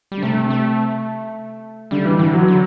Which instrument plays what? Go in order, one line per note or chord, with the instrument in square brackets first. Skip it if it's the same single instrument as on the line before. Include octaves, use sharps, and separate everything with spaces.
[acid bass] G3
[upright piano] D3
[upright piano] C3 [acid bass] A3
[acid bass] A3
[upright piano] D3 [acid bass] G3
[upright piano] E3
[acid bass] D3 [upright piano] E3
[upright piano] F#3
[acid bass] D3